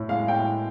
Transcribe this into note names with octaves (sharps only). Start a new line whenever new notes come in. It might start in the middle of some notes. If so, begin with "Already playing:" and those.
Already playing: A2
G#3 F5
A2 G5